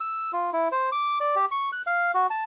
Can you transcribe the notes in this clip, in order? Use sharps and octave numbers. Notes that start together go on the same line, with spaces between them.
E6
F4
E4
C5
D6
D5
G4
C#6
F#6
F5
F#4
A5